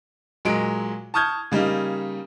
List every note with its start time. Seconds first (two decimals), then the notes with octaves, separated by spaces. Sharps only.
0.45 A#2 F#3 G#3 D7
1.14 A5 C#6 D#6 F6 G6 G#6
1.52 C#3 G3 A#3 D#4